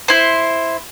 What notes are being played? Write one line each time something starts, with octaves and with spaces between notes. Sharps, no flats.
E4 C5